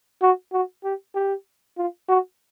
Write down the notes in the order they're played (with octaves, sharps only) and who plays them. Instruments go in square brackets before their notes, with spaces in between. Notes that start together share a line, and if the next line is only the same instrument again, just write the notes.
[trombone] F#4
F#4
G4
G4
F4
F#4